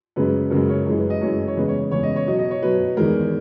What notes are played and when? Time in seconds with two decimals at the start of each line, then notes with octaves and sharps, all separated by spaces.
0.16 F#2 C#3 G#3 B4
0.51 F#2 C#3 G#3 A#4
0.69 C#5
0.87 F#2 E3 G#3
0.98 B4
1.10 D#5
1.21 F#2 E3 G#3 C#5
1.48 C#5
1.56 E2 C#3 G#3 B4
1.68 C#5
1.91 E2 C#3 G#3 C#5
2.03 D#5
2.16 C#5
2.27 B2 F#3 D#5
2.39 D#5
2.51 C#5
2.62 B2 F#3 B4
2.97 E2 D#3 G#3 A#4